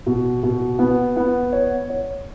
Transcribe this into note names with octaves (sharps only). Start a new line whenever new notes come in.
B2
B2
B3
B3
C#5
C#5